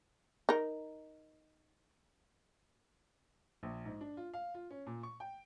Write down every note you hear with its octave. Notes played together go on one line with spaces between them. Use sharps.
D#4 A#4
A#1
G#2
D4
F4
F5
F4
C#4
A#2
C#6
G5